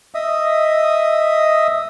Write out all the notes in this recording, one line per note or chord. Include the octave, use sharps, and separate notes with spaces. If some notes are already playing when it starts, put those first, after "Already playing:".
D#5 E5 D#6